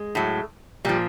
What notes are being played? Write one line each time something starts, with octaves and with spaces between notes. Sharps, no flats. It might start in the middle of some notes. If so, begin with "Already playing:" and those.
Already playing: G#3
A2 F#3
A#2 F3 G3